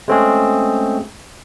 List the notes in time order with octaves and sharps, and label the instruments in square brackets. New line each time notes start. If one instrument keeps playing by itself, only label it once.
[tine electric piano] G#3 A3 C4 C#4 F#4 G#4